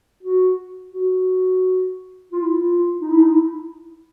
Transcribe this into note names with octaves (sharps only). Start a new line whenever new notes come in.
F#4
F#4
F4
E4
F4
D#4
E4
D#4
E4